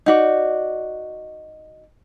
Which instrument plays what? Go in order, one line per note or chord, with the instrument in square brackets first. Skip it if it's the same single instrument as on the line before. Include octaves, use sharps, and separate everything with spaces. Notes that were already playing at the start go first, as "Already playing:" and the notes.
[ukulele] D#4 F#4 D5